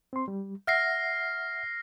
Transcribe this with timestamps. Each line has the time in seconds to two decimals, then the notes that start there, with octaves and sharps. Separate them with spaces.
0.13 C4 C6
0.28 G3
0.67 E5 F#5 F6 A#6 C7